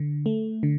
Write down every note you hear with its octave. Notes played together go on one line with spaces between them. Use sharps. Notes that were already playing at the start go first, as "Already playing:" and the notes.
Already playing: D3
A3
D3